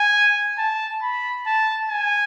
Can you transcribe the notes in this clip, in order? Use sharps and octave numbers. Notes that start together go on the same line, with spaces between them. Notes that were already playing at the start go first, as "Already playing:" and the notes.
Already playing: G#5
A5
B5
A5
G#5